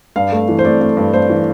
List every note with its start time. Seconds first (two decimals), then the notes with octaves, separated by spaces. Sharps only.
0.16 G2 F5
0.32 A3
0.49 E3
0.59 C5
0.64 A3 D5
0.81 A3
0.97 G2
1.14 A3 C5
1.30 E3